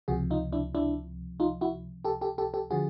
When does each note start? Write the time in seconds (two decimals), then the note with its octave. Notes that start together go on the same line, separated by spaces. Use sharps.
0.08 C#2 C3 F3 F#4 G#4
0.30 D#4 F4
0.53 D4 E4
0.75 D4 E4
1.40 D#4 F4
1.61 E4 F#4
2.05 G4 A4
2.21 G4 A4
2.38 G4 A4
2.54 G4 A4
2.71 D3 F3 F#4 G#4